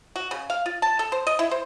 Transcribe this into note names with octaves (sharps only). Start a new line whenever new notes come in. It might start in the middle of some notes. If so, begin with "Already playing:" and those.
F#4
C#3
F5
F4
A5
A4
C5
D#5
E4
C5